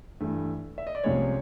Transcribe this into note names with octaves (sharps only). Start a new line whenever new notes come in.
G2 E3 A3
E5
D#5
D5
C2 C3 F3 G#3 C#4 C#5